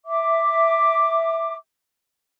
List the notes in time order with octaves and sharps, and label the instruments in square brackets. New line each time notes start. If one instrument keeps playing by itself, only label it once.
[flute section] E5 D6